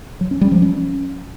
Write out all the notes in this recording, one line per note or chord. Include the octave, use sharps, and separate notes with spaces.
F#3
C#4
G3
F3
C#4